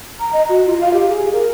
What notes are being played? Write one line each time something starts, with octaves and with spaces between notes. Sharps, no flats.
A#5
D#5
F#4
F4
F5
G4
G#4
A#4